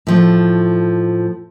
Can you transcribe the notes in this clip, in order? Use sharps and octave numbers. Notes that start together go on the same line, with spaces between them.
A2 F3 A3